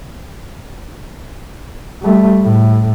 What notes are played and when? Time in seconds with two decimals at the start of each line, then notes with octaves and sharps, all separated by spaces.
2.02 G3 A3
2.43 A2